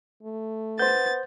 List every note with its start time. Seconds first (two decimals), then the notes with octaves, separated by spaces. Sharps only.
0.22 A3
0.79 B3 C5 G6 A6